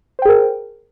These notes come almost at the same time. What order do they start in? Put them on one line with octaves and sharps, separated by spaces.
C5 G5 G#4 A#4